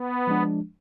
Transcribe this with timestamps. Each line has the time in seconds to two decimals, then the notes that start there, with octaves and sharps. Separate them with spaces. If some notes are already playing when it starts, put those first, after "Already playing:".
Already playing: B3
0.27 F3 G#3 D4